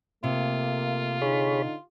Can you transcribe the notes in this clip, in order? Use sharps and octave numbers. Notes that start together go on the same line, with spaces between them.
C3 A3 A#3 F4
D3 D#4 G#4 C#5 B5